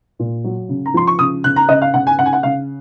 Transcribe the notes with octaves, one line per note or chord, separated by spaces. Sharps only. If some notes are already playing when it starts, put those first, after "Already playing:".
A#2
F#3
C#3
A#5
F3 C6
C#6
C#3 D#6
C#3 F#6
A#5
C#3 D#5
F5
C#3 F#5
G#5
C#3 F#5
G#5
F#5
C#3 F5